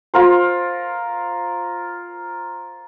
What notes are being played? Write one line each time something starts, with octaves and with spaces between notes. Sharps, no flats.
F4 A#4 C5